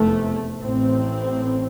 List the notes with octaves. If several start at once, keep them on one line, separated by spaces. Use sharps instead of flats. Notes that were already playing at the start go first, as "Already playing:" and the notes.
Already playing: F1 E2 C3 A3
A1 A2 C4